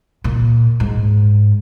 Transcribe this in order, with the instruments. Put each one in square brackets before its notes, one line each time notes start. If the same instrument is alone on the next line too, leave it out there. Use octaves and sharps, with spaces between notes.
[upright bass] A#2
G#2